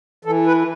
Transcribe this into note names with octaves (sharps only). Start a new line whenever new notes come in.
E3 A4
B4